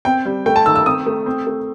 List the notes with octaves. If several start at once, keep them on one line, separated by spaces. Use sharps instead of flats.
C4 G5
G3
A3 G5
A5
D#3 E6
E6
C4 D#6
A3
C4
A3